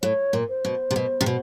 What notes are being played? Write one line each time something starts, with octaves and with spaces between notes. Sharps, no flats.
A2 C#5
A#2
C5
B2
C3
B2
C3
B2